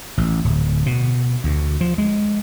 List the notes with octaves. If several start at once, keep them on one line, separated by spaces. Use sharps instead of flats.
A1
D1
B2
D2
F3
G#3